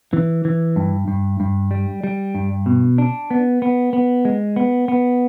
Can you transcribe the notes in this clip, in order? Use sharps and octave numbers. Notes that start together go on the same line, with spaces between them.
E3
E3
G2
G2
G2
G3
G3
G2
B2
D4
B3
B3
B3
G#3
B3
B3